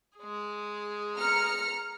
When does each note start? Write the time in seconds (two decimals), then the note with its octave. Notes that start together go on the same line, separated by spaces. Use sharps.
0.18 G#3 G#4
1.18 A#5 F6 C#7